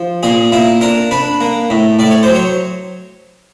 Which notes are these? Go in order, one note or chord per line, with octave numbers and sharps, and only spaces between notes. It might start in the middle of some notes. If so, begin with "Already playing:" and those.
Already playing: F3
A#2 G#4
A#3 E4
D4 A#4
D4 B4
A#3
A2
A2 D5
C#5
F#3 C5
C#5